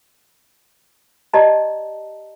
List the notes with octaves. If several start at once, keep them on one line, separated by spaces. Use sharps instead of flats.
G4 D5 D#5 A5 A#5